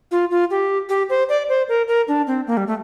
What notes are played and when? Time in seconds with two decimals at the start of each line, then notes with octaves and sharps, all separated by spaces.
0.11 F4
0.31 F4
0.51 G4
0.89 G4
1.10 C5
1.29 D5
1.49 C5
1.69 A#4
1.88 A#4
2.08 D4
2.27 C4
2.47 A#3
2.57 G3
2.67 A3